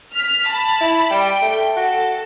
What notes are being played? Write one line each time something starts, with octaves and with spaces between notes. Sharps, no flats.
F6 B6
A5 B5
E4
G3 G5
A3
F#4 A4